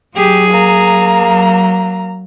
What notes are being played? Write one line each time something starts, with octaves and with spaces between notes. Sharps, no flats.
F#3 G4 G#4
A#3 A#5
F#3